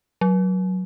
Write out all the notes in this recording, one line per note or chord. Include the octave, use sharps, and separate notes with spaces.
F#3